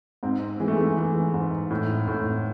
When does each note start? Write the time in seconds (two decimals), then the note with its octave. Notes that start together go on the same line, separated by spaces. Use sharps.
0.23 G#2 C4
0.60 E3 G#3
0.68 A3
0.77 G#3
0.97 E3
1.34 G#2
1.70 A2
2.08 A2